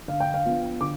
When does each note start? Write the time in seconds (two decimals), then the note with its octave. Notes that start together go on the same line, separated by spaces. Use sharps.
0.08 D3 F5
0.20 G5
0.34 F5
0.45 F3 B3 D4
0.81 D3 D6